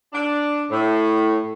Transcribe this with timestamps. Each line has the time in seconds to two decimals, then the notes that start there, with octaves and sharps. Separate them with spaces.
0.13 D4
0.70 A2